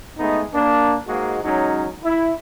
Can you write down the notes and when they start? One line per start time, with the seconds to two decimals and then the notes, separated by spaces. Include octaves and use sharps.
0.18 G#3 A3 B3 D#4
0.53 A#3 D4
1.07 G#2 G#3 A#3 F#4
1.43 F#3 G#3 C#4 D#4
2.02 E4